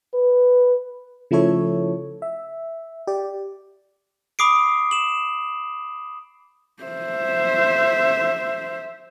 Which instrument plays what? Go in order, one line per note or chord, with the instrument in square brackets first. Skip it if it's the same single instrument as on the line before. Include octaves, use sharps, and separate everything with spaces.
[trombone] B4
[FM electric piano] C#3 F3 A3 E4 A4 C#5
E5
G4 D5
[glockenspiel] B5 D6 D#6 C7 D7
E7 F#7
[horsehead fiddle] C5 E5